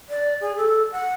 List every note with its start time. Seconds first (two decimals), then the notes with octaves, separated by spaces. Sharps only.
0.09 D5
0.41 G#4
0.57 A4
0.92 F#5